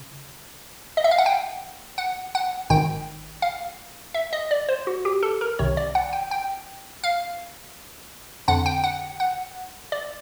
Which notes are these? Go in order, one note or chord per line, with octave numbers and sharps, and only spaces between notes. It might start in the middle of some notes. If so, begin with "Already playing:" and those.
Already playing: C#3
D#5
E5
F5
F#5
G5
F#5
F#5
G#1 G#2 D#3 G5
F5
E5
D#5
D5
C5
F#4
G4
A4
A#4
C2 C3 D#3 C#5
D5
F#5
G5
G5
F5
F2 D3 F#5
G5
F#5
F#5
D5